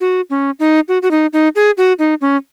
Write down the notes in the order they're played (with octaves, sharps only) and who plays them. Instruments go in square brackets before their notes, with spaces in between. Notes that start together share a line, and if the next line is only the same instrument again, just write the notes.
[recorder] F#4
C#4
D#4
F#4
F#4
D#4
D#4
G#4
F#4
D#4
C#4